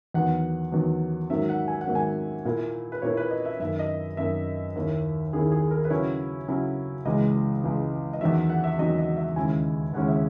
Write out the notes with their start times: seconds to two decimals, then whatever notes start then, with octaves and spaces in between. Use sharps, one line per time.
0.14 E2 D#3 F#3 B3 F#5
0.72 E2 D#3 F#3 B3
1.30 G#2 D#3 F#3 A#3 E5
1.49 F#5
1.68 G#5
1.81 F#5
1.87 G#2 D#3 F#3 A#3
1.95 G#5
2.45 A#2 A#3 E4
2.92 B4
3.02 A#2 A#3 E4 C#5
3.17 B4
3.31 D#5
3.45 E5
3.60 F#2 D#3 A#3 E5
3.79 D#5
4.17 F#2 D#3 A#3 E5
4.76 D#2 D#3 A#3 E4
5.33 D#2 D#3 A#3 E4 G#4
5.52 G#4
5.71 A#4
5.85 B4
5.90 C#3 F#3 C#4 E4 C#5
6.48 C#3 F#3 C#4 E4
7.05 C#2 C#3 E3 G#3 D#5
7.63 C#2 C#3 E3 G#3
8.13 D#5
8.21 E2 D#3 F#3 E5
8.50 F#5
8.64 E5
8.79 E2 D#3 F#3 D#5
8.98 D#5
9.16 E5
9.36 D#2 C#3 G#3 C#4 E4 G#5
9.93 D#2 C#3 G#3 C#4 E4 F#5
10.08 E5